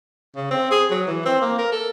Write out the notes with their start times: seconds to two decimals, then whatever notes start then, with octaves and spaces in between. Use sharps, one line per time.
0.36 C#3
0.51 C4
0.71 G#4
0.91 F#3
1.07 E3
1.25 C4
1.42 A#3
1.58 A#4
1.72 A4